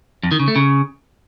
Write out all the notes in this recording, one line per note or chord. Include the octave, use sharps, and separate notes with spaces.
F2
D#3
C#3
A3
C#3